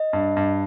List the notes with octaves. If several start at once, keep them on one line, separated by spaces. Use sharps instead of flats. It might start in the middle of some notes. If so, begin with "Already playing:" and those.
Already playing: D#5
G2
G2